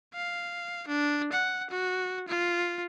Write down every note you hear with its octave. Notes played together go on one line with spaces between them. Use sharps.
F5
D4
F#5
F#4
F4